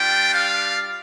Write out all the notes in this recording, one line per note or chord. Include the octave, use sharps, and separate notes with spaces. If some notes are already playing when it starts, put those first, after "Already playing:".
Already playing: G3 D4 F4 G5
F5